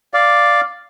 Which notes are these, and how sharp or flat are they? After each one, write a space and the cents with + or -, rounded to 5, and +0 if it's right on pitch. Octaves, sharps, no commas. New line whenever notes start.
D5 +0 F5 +0